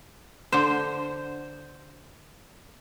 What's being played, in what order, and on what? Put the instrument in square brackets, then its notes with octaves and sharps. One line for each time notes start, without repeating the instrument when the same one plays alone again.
[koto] D3 C5